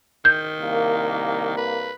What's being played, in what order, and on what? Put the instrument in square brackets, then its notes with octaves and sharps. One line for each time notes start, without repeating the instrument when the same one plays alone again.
[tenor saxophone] D#3 [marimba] G6
[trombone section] C2 A#3
[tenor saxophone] B4